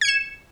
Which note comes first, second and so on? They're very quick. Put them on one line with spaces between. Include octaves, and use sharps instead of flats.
G#6 C#7 E7